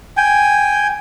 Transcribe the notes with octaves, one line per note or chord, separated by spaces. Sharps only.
G5 G#5